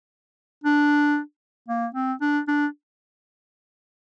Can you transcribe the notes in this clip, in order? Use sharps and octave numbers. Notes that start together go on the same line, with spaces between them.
D4
A#3
C4
D4
D4